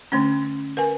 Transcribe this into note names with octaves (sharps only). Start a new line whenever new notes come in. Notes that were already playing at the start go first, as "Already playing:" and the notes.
D3 A3 C#4
A#4 B4 G#5